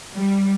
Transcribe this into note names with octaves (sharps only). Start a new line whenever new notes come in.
G3